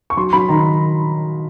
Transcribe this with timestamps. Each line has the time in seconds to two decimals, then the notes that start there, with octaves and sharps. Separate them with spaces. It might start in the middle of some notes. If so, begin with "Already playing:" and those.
0.10 C#6
0.17 F#3 C6
0.33 F#3 B5
0.49 D#3 A#5